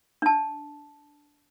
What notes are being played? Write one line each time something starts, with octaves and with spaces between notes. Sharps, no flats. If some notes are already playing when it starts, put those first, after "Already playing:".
D4 A5